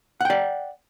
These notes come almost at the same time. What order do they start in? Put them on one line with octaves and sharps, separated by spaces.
F#5 G5 D5